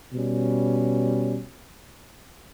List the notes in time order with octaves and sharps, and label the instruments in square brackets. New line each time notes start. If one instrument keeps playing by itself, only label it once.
[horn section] B2 G3 C#4